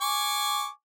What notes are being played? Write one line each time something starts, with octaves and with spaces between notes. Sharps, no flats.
G#5 C#6 D6